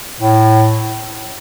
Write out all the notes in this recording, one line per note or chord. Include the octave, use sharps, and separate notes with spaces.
A2